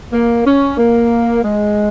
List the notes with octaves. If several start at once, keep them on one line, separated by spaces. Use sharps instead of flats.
A#3
C#4
A#3
G#3